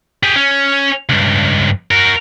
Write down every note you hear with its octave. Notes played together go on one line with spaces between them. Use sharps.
G4 G#4
C#4
C#2 G2
F#4 A#4